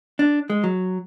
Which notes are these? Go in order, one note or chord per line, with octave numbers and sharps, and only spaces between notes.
D4
G#3
F#3